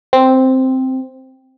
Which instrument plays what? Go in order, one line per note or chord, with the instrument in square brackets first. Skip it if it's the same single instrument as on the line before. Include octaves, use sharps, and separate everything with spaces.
[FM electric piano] C4